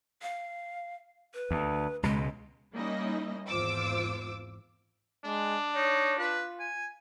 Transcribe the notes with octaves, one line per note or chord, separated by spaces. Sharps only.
F5
B4
D2
C#2 B2 G#3
G3 A#3 C#4 D#4 E4 D#5
G#1 E2 F4 C5 D6 E6
G#3 D4
D#4 C#5
F4 B4
G#5